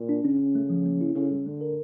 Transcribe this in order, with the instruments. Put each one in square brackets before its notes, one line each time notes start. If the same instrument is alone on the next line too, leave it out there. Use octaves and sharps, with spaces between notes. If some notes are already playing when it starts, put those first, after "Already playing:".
Already playing: [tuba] A#2
[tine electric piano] D4
[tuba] C#3 [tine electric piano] C#4
[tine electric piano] C#4
A3
F3
A#3
E4
[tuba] C#3 [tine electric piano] A4
[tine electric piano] G3
[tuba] D3 [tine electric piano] A3
[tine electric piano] A#4